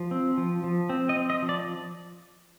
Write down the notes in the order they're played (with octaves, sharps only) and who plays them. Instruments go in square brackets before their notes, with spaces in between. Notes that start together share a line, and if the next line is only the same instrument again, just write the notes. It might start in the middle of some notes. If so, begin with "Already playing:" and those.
Already playing: [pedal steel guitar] F3
C4
F3
F3
C4
D#5
C4
D#5
F3
D5